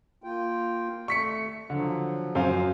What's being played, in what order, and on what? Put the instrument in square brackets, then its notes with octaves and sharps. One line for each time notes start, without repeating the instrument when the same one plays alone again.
[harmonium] A#3 F4 G5
[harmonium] A3 [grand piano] C#6 B6 C#7
[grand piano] D3 [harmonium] F3 F#3
[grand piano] F#2 C5 F5